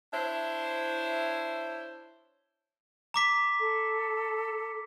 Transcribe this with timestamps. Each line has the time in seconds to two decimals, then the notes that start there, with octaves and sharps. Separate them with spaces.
0.13 D4 E4 C5 C#5 E5
3.14 A#5 D6 B6
3.60 A4